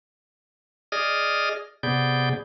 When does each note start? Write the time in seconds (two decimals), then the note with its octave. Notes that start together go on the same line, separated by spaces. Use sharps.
0.92 G#4 D5 D#5 D#6 F6
1.83 C3 B3 G#4 D5 G6